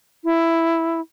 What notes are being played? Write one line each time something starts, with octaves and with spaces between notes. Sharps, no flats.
E4